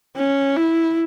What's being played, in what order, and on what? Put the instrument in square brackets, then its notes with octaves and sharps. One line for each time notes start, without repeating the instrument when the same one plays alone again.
[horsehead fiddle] C#4
E4